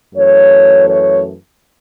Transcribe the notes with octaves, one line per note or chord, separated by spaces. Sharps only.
F#2 E3 A3 C#5
C#5